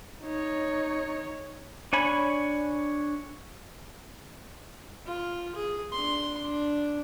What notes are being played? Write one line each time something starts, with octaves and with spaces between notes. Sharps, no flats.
D#4 C#5
D4 C#5 G#5 B5
F4
G#4
D4 C6
D4